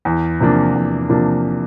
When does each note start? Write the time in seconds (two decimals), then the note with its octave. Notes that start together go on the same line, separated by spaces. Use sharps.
0.05 E2
0.40 C3 F3 A#3 D4
0.75 E2
1.09 C3 F3 A#3 D4